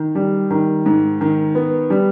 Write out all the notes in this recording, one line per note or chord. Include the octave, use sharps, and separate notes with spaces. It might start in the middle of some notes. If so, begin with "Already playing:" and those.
Already playing: D#3
G3
D#3
G#2
D#3
B3
G3